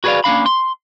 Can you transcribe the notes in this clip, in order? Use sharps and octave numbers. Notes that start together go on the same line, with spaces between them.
F#4 G#4 B4 C5 D5 F5
A#3 C#4 D4 F5 B5
C6